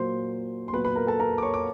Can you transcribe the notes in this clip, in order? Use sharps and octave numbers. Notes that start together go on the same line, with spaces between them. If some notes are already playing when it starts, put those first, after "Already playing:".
Already playing: A#2 F#3 A#3 C5 C6
C6
A#2 F#3 B3 B4 B5
B4 B5
A#4 A#5
A4 A5
A#4 A#5
D6
C#5 C#6
D6